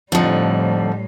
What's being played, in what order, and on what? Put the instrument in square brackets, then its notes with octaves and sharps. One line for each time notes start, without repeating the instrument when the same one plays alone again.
[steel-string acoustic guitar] F2 D3 [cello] A2 G3 [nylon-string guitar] F3 D#4